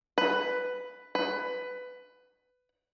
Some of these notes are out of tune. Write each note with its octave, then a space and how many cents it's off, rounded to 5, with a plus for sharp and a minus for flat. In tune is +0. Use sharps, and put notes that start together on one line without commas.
B4 +10
B4 +15